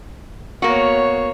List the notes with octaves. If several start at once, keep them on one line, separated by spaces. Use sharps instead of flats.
A#3 B3 F#4 C#5